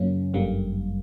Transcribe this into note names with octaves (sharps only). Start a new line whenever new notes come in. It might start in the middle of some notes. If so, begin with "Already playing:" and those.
Already playing: F#2 C#3 F#3 A#3 C#4
G1 F#2 D3 G3 A#3